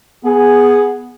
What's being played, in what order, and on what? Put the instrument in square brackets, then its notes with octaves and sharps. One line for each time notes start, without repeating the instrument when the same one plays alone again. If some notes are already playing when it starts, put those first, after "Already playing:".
[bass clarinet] B3 [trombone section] G#4